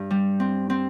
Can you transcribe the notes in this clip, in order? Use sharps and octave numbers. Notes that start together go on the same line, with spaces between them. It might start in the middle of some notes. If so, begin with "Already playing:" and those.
Already playing: G2
G3
C4
C4